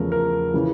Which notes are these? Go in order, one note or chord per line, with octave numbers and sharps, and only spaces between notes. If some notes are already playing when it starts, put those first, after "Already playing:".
Already playing: E2 C#3 F3 A3 A#4
A#4
C#3 E3